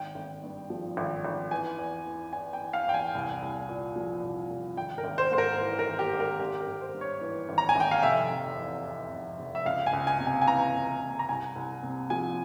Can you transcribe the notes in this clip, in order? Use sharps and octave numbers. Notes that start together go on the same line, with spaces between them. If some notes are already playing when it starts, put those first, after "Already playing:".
Already playing: G#1 G5
G#1
G2
F3
G#1
G#1
E3 G#5
E2
E3
E2 G#5
G5
E3
F5
E2 G5
G#5
C2
C2
A#2
F3
C2
C2
G#1 G5
A#4
G#1
C5
G#2 C5
A#4
E3
A#4
G#1
G4
G#1
A#4
G#1 G4
A#4
G#1
C5
G2
C#5
E3
G#1
A#5
G#5
G#1 G5
F5
F1 E5
F1
E2
E3
F1
F1
E5
C#2 F5
G#5
C#2
G#5
C3
G#5
G#5
E3 A#5
C#2
C#2
A#5
C2 G#5
C2
C3
F3 G#5